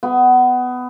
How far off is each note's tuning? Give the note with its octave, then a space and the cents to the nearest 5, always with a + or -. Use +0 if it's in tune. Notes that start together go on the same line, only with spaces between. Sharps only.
B3 +20